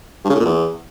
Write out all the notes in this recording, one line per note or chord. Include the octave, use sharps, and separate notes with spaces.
G2
C#3
A2
A#2
E2